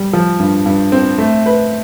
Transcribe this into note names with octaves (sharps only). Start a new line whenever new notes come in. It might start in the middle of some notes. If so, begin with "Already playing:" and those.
Already playing: G3
F3
G2
G2
C4
A3
B4